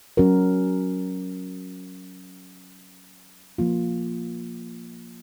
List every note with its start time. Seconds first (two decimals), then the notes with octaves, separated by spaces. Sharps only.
0.17 F#3 C#4 F#4 A#4
3.58 F3 A#3 F4